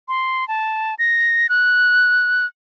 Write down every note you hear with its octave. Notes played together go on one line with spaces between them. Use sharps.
C6
A5
A#6
F#6